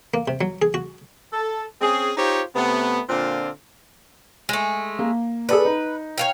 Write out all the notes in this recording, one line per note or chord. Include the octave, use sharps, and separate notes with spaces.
A#3
C3
F#3
G#4
F#4
A4
C4 C#4 G#4
D#4 F4 G4 C5 C#5
C3 A3 B3
A#2 D3 C4 D4 F4
G#3 A3
A#3
G#4 A4 B4 D5
D#4
C#5 F5 G5